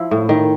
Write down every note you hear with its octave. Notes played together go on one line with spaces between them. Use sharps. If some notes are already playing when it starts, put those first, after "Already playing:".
Already playing: F3 E4
A2
D#3